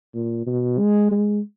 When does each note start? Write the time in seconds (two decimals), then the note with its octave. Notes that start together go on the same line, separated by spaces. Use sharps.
0.14 A#2
0.46 B2
0.78 G#3
1.11 G#3